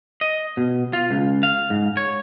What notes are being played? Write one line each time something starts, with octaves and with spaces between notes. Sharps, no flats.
D#5
B2
F4
C#2
F5
G#2
C#5